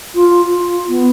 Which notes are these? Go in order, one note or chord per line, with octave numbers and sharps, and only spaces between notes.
F4
F4
B3